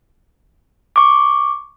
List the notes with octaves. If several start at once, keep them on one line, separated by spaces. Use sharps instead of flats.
C#6 D6